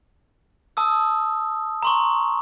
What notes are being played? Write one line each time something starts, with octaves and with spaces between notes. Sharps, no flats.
A5 D#6 E6
A#5 C6 C#6